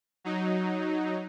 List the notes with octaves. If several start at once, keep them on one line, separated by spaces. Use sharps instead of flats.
F#3 D#4